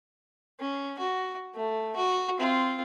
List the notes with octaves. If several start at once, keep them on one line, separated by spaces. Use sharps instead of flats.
C#4
F#4
A3
F#4
C4 F4